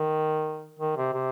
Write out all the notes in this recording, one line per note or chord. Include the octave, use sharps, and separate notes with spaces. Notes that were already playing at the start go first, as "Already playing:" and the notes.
Already playing: D#3
D#3
C3
C3